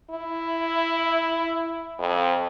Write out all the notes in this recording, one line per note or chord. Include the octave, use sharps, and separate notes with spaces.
E4
F2